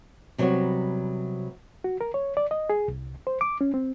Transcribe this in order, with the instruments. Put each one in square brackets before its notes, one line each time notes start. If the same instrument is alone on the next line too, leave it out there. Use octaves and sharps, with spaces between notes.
[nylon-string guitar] C3 F#3 G3 B3 F#4 C#5
[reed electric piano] F#4
A#4
C#5
D5
D#5
G#4
C2
C5
D6
C#4
C4